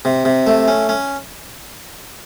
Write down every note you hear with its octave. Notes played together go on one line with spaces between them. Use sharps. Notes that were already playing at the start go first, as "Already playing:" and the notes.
C3
C3
A3
C#4
C#4